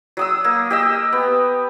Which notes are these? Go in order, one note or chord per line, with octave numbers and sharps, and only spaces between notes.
F#3 D#6 E6
A#3
G4 D#5 E6
B3